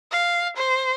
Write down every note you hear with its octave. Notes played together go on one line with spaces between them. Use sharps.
F5
C5